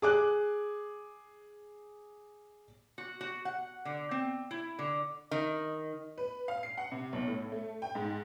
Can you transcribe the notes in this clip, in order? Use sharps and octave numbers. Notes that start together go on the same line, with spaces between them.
G#4 D6 F#6
F#4
F#4
F#5
D3
C4
E4
D3
D#3 D#5
B4
F5
C7
F#5
C3
B1
A2
A3
G5
G#2